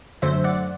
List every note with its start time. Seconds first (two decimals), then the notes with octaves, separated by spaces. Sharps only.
0.22 F#2 D3 F#3 A3 C5 E5
0.44 D5 F#5